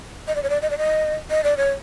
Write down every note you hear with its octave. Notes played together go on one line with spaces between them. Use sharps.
D#5
D5
C#5
D5
D#5
D5
D#5
D#5
D5
C#5